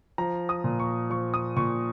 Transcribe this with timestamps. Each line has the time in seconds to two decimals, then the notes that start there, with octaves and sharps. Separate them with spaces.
0.18 F3 A#5
0.49 D#6
0.64 A#2
0.79 C#6
1.10 F3 C#6
1.34 D#6
1.56 A#2 C#6